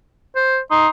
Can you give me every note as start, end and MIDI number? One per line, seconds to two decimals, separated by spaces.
0.36 0.59 72
0.71 0.88 63
0.71 0.89 84